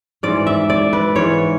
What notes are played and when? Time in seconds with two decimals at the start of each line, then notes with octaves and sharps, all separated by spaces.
0.23 G#2 E3 D5
0.47 E5
0.70 D5
0.93 B4
1.16 G#2 E3 C#5